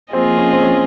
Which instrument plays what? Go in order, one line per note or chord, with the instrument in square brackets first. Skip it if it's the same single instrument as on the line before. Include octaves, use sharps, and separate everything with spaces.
[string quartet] F3 A#3 F4 G#4 D#5 [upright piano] C4
[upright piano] C#4
C4
C#4